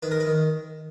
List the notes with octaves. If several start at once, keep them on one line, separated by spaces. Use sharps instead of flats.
D#3 B4
A#4
B4
D#3